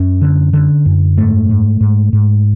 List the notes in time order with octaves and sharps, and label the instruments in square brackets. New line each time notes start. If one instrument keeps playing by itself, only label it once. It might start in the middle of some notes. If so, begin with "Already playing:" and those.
Already playing: [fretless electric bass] F#2 C#4
D3
D3
F#2
G#2 A3
G#2
G#2
G#2